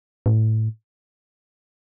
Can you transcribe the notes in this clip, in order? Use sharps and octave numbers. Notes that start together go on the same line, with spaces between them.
A2